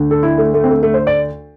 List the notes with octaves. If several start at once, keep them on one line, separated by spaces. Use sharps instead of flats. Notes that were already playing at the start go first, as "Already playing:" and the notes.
Already playing: D2 D3
A4
E4
A3
A3
C4
A3
A3
C5
D5